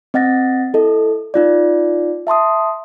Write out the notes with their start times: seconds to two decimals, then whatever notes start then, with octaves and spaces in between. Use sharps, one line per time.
0.14 C4 D#5 F#5 A6 A#6
0.74 E4 A4 D#5
1.34 D#4 F4 D5
2.27 E5 A5 C6 D#6